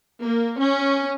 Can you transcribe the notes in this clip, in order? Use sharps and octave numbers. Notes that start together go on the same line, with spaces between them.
A#3
C#4